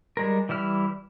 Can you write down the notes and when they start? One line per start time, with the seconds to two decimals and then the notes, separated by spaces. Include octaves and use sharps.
0.17 G3 G#3 A#4
0.49 E3 G3 E4 F6